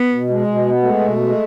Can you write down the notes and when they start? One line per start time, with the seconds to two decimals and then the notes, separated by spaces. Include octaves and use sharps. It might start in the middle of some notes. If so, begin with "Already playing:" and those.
Already playing: B3
0.11 B2
0.29 G#3
0.47 B2
0.65 B3
0.83 G#3 A3
1.00 B2
1.18 G#3